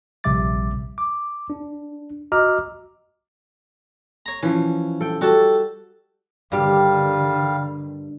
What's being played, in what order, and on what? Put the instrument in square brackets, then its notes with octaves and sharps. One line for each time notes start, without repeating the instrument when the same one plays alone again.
[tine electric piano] A#1 C3 G3 E5 D6 A6
D6
D4
F#4 D#5 A#5 D6 E6 F6
[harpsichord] C#5 A#5
[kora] E3 F3 [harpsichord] C#4
[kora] A4 G5
[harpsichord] G3 A4 [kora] F#4
[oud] G2 G4 [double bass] D3 D#3 [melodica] G3 F5